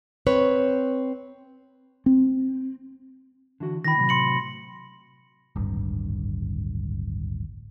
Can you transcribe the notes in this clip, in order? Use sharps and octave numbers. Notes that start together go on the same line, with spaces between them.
C4 B4 C#5
C4
D3 E3 F#4
D#3 E4 G5 B5 A#6
A2 C3 F#3
C6 C#7 F#7
D1 G#1 G2